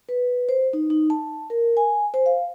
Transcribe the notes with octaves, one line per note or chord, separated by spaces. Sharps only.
B4
C5
D#4
D#4
A5
A#4
G#5
C5
F5